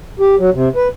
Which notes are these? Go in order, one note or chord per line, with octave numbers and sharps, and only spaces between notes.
G4
F#3
C3
B4